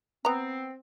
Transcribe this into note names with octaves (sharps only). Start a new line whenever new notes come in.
B3 C4 A#5